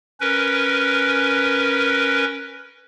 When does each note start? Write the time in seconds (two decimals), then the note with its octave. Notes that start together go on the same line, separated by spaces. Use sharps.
0.21 C#4 A#4 B4